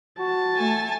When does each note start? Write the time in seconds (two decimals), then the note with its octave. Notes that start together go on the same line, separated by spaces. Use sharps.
0.19 F#4 A5
0.55 A3 G#5 A6